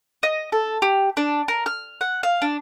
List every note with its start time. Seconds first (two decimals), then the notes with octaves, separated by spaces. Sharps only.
0.23 D#5
0.52 A4
0.82 G4
1.17 D4
1.48 A#4
1.66 F6
2.01 F#5
2.23 F5
2.42 D4